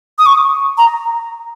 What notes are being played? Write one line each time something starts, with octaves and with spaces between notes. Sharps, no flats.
D#6
C#6
A#5